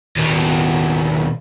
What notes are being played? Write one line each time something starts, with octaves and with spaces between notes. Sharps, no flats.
D#2 B2